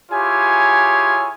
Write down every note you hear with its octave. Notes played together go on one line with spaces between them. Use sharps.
E4 F4 G4 G#4 C#5 G#5